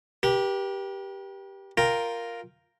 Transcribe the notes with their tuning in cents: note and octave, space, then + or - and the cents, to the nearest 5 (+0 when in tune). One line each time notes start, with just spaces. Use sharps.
G4 +0 B4 -45
F4 +0 A#4 +0 G5 +0